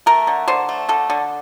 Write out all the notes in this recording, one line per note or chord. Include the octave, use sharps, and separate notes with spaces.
A3 A#4
D3
D3 C5
A3
D3 A4
D3